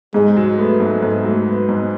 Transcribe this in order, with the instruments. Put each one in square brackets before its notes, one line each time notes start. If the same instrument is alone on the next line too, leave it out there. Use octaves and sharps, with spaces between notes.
[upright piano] G#2 [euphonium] G#3
[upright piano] F#3
[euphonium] A3 [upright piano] B3
[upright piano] G#2
G#2
F#3
B3
G#2